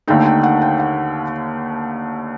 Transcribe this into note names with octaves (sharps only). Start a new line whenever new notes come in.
D#2 D3 A3 D#4 G5
G5
F#5
G5
F#5